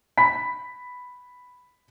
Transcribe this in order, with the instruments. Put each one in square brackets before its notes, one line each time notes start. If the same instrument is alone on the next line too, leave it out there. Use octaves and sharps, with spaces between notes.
[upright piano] B5 B6